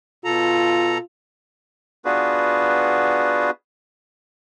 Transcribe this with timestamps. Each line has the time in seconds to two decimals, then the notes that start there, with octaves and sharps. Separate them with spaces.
0.25 B2 F4 A4 A#5
2.05 B3 D4 F4 F#4 G#4 B4